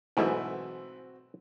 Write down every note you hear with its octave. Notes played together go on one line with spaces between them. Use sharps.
B1 G#2 B2 E3 A3 C4 F#4 E5